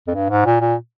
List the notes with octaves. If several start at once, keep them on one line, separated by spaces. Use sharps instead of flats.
F2
G2
G#2
A#2
A#2